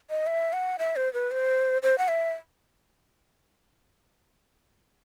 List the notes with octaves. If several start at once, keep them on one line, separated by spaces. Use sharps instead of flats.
D#5
E5
F#5
E5
C5
B4
C5
C5
F#5
E5